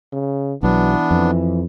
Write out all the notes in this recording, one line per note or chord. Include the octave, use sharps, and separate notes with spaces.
C#3
B1 E3 F#3 B3 D4
F2